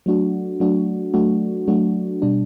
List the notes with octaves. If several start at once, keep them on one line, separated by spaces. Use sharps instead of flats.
F#3 A3 D4 F#4
F#3 A3 D4 F#4
F#3 A3 D4 F#4
F#3 A3 D4 F#4
B2 G3 D4